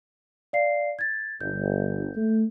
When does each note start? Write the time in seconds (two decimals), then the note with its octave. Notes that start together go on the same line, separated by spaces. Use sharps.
0.53 D5 F5 C7
0.99 G#6 A6
1.41 G1 G6
2.16 A3